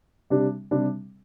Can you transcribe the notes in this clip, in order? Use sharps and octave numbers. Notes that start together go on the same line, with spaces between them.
C3 G3 D4
C3 G3 D4